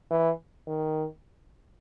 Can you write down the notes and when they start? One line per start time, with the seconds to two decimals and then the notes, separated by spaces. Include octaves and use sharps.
0.11 E3
0.67 D#3